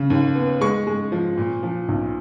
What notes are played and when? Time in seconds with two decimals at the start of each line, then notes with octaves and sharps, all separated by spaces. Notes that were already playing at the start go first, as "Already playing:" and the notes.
Already playing: C#3
0.10 D#2
0.35 B3
0.61 G#3 C#6
0.87 G#3
1.12 F3
1.38 A#2
1.63 F3
1.88 B1